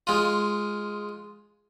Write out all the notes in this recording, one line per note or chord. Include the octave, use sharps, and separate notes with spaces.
G#3 F4